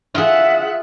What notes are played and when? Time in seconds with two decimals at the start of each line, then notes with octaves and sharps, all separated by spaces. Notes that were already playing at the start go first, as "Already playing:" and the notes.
0.15 F4 G#4 E5 F#5